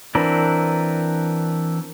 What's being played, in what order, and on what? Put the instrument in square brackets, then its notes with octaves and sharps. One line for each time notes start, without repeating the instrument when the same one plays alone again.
[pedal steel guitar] E3 C4 D4 A#4 B4